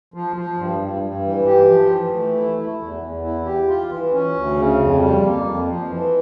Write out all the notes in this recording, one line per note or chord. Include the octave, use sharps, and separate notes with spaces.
F3
F3
G2
G2
G2
E3
G4
F3
E3
A3
E4
E4
E2
E2
E4
G4
F4
E3
C#4
D2
C#3
F2
G3
A#3
F2
F3
E3